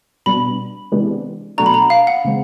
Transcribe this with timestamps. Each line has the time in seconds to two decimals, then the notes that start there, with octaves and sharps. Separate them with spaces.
0.26 B2 G3 B3 D4 B5
0.92 C3 E3 G#3 B3 D4
1.58 B2 F#3 A3 D4 F#4 A#5
1.66 B5
1.74 A#5
1.90 F5
2.07 F#5
2.25 C#3 E3 G#3 C4